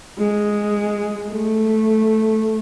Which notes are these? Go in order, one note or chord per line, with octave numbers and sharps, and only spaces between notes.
G#3
A3